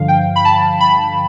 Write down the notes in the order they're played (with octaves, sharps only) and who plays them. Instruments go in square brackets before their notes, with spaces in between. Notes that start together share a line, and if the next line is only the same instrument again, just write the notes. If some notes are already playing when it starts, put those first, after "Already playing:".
Already playing: [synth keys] G2 D3 F3 F5
G5
B5
A5
B5